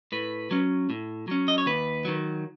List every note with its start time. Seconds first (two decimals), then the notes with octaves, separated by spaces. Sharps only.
0.12 A2 B4
0.51 F#3 C#4
0.90 A2
1.28 F#3 C#4
1.48 D#5
1.58 C#5
1.66 D#2 B4
2.05 D#3 F#3